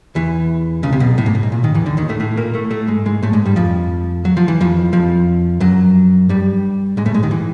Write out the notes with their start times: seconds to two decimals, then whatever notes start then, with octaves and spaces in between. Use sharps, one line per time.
0.15 E2 E3
0.83 C#2 C#3
0.93 C3
1.00 B1 B2
1.18 A2
1.26 G#2
1.35 A2
1.43 G#2
1.52 A#2
1.63 D#2 D#3
1.75 E2 E3
1.86 D2 D3
1.97 D#2 D#3
2.09 A2 A3
2.20 A2 A3
2.37 A#2 A#3
2.54 A2 A3
2.71 A2 A3
2.87 G#2 G#3
3.06 G#2 G#3
3.23 A2 A3
3.33 G#2 G#3
3.46 G2 G3
3.56 F2 F3
4.25 F#3
4.37 F3
4.48 E3
4.61 F2 F3
4.93 F2 F3
5.60 F#2 F#3
6.29 G2 G3
6.97 G#2 G#3
7.06 A2 A3
7.14 G#2 G#3
7.23 D#2 D#3
7.31 E3